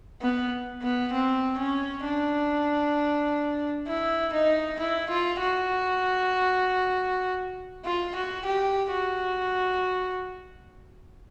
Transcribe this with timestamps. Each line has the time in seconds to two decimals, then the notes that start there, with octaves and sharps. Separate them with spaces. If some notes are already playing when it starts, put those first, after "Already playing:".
0.22 B3
0.82 B3
1.13 C4
1.58 C#4
2.04 D4
3.87 E4
4.33 D#4
4.79 E4
5.09 F4
5.40 F#4
7.85 F4
8.15 F#4
8.45 G4
8.92 F#4